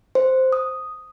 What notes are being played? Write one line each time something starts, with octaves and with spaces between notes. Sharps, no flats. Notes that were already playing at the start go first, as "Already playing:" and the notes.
C5
D#6